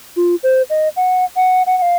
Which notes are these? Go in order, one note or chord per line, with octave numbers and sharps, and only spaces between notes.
F4
C5
D#5
F#5
F#5
F#5
F#5
F5